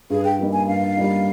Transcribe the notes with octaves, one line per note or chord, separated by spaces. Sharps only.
G2 G#4
G5
G3 A#3 D#4
G#5
G2 F5
G3 A#3 D#4